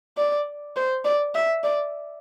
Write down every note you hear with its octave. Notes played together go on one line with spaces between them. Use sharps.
D5
C5
D5
E5
D5